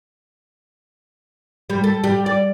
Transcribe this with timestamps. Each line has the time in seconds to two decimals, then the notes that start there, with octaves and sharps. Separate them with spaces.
1.70 G3
1.84 A4
2.04 G3
2.26 D5